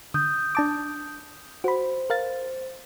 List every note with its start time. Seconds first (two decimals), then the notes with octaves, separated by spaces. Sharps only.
0.14 D3 D#6 G6
0.55 D4 A5 D6
1.64 F#4 C5 B5
2.10 A#4 F5 A6